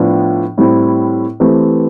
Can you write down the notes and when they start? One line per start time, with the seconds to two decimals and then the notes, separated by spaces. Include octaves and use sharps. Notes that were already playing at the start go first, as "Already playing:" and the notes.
Already playing: A2 F3 B3 D4
0.58 A2 G3 C4 E4
1.40 E3 A3 C4 G4 B4